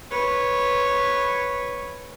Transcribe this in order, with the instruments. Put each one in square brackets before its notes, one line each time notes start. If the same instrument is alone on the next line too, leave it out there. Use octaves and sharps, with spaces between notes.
[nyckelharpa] B4 C#5